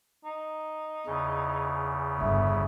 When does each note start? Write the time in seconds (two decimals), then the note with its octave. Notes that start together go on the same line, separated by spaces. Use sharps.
0.25 D#4
1.07 E2 C#3
2.20 G1 E5